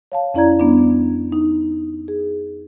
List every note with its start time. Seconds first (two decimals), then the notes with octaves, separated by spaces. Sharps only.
0.12 C#5 F5 A5
0.34 F2 C#4 E4 D5 A#5 G#6
0.60 G3 B3 D4
1.32 D#4
2.08 G#4